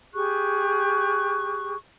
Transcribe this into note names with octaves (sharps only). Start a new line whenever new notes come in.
G4 G#4 C#6 F#6